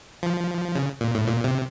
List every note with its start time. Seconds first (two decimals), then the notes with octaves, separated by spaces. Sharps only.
0.23 F3
0.75 C#3
1.01 A#2
1.15 A2
1.27 A#2
1.44 C3